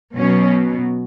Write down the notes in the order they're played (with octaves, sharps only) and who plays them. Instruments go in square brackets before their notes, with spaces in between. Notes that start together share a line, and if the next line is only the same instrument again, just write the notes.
[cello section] B2 F#3 C#4